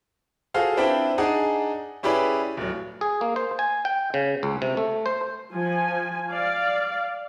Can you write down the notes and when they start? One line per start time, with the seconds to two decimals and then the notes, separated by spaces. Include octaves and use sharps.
0.54 F4 F#4 G#4 A4 C5 F5
0.77 C4 D4 E4 B4 E5 G5
1.18 D4 D#4 G#4 F#5 G#5
2.03 C#4 E4 G4 G#4 B4 D5
2.57 D1 F#3
3.01 G#4
3.21 A#3
3.36 C5
3.59 G#5
3.85 G5
4.14 C#3
4.43 C#2
4.62 C3
4.77 A3
5.06 C5
5.53 F3 G#5
6.31 D5 F5